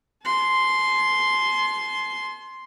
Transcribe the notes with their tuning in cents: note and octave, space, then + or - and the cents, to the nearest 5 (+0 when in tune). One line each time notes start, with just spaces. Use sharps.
A5 -45 C6 +0